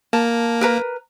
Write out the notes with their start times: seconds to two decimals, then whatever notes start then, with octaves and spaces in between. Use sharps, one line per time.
0.13 A#3 A5
0.61 A#4 B4 A#5